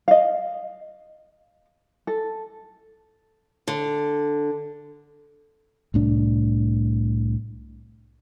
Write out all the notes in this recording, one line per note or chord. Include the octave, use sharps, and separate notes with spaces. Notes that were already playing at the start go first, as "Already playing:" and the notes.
D#5 F5
A4
D3
C2 A2 D4